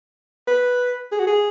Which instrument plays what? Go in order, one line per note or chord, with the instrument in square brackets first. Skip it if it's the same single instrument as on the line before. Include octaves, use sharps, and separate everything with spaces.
[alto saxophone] B4
G#4
F#4
G#4